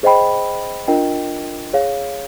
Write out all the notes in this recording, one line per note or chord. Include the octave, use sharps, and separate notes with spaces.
G#4 C5 D#5 G5 B5
D4 F4 A#4 D#5 G5
G#4 C#5 F5